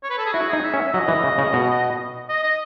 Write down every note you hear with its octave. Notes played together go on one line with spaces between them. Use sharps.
C#5
B4
A4
G#4
E4 F#4
D#4 G#4
E5
C#4
E5
F#3 D#5
E3
C#3
C#3
B2
D#5
D#5